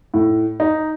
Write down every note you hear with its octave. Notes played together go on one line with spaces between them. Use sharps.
A2
D#4